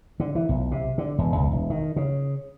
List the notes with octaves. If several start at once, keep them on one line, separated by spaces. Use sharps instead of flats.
D3
E3
B1
C3
D3
E1
C#2
E1
D#3
C#3